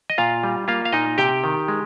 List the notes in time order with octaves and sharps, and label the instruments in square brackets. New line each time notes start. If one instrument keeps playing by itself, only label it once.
[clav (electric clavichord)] D#5
A#2 F4 F5
G3
A#3 F4 F5
F5
A#2 D#4 D#5
C3 G4 G5
D#3
G#3